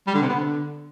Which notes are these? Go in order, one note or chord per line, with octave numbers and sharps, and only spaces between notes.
G3
D3
C3
B3
D3